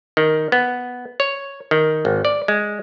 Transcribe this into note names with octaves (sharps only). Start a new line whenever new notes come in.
D#3
B3
C#5
D#3
G#1
D5
G#3